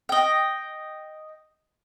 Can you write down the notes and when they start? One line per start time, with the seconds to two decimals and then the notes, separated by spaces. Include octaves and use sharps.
0.09 D#5 G5